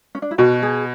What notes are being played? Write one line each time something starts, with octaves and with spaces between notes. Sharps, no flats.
C#4
D4
E4
B2 F#4
G#4